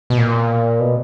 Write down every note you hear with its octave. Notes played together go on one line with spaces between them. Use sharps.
B2
A#2
B2